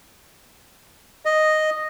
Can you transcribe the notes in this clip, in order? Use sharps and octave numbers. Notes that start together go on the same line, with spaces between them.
D#5